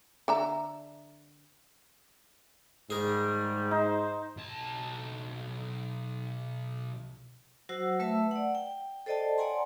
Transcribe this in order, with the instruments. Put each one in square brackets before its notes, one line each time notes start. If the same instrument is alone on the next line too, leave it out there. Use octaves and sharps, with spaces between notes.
[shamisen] D3 E5 A#5
[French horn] G#2 [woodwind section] D#3 G3 [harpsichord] G#4 A#4
[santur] D#4 [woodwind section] C5
[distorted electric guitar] B1 A5
[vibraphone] F#3 F#4 C5 F#5 E6
A3 B4 E5 A5 E6
D5 F#5
G5
A4 C5 D5 D#5 G5 A5
C#5 D5 F#5 G#5 A#5 C6